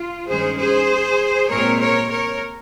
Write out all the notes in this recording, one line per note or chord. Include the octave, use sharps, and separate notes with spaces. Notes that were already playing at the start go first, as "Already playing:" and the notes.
Already playing: F4
G2 D#3 G#3 C#4 G#4 C5
G#4 C5
A#2 G#3 C4 A#4 C#5
A#4 C#5
A#4 C#5